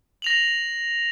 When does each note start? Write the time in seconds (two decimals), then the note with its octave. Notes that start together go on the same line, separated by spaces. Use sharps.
0.22 A#6 F7 F#7